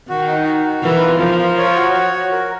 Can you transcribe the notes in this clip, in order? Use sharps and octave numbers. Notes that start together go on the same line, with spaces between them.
D#3 F#4
D#4
F#4
F#4
E3 A#4
F4
F3 A#4
F4
C#5
F#4
C#5
F#4
A#4